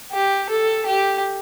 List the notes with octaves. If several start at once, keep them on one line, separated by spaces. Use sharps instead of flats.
G4
A4
G4